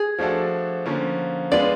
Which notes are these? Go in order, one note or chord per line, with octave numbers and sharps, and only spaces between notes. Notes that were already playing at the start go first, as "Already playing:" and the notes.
Already playing: G#4
F3 A3 D4 F#4 A4
D3 F3 A#3 C#4
G#3 B3 D4 F4 D5